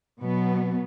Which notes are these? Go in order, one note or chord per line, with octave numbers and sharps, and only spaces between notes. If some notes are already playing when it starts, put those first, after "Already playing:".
B2 F#3 B3